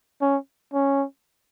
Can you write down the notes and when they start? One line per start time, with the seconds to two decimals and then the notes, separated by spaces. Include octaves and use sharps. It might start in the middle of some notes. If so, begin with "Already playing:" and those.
0.21 C#4
0.74 C#4